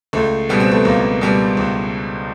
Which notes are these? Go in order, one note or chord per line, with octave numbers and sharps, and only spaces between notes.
C#2 A3
B2 G3 B3
C4
A3 B3
C#2 A#3
B2 G3
C#2